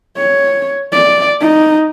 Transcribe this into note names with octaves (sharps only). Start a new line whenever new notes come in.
C#5
D5
D#4